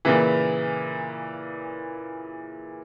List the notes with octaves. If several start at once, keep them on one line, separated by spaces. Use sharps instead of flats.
A#2 C#3 E3